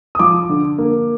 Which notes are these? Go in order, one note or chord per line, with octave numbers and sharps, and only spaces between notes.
D#6
F3 D6
D3
A#3